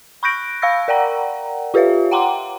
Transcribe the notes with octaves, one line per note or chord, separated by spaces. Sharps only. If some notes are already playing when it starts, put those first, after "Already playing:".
B5 C#6 F#6 G6 A#6 D7
F5 B5 C#6 E6 A#6
A#4 D5 F#5 G5 A#5
F4 G4 B4 C#5 E5 F5
F#5 G5 A#5 C6 D6